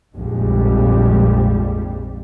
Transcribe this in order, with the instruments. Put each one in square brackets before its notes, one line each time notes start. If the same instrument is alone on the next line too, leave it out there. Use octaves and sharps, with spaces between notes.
[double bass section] A#1 F2 G#2 G3 G#3